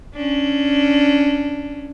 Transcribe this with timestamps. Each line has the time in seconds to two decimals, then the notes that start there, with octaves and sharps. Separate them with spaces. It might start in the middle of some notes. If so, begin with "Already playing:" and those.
0.16 C#4 D4